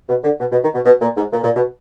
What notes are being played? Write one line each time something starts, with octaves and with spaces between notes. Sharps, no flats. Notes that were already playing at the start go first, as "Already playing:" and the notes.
B2
D3
B2
B2
D#3
B2
B2
A#2
G#2
A#2
A#2
B2